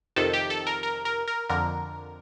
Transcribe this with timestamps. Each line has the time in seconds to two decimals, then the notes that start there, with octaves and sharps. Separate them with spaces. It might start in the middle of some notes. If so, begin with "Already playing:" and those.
0.16 F2 C3 D#3 A4
0.33 G4
0.50 A4
0.67 A#4
0.83 A#4
1.05 A#4
1.28 A#4
1.49 F2 D3 A#4